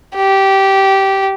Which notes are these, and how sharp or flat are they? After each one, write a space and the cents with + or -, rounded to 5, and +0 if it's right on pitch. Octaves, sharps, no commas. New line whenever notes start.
G4 -15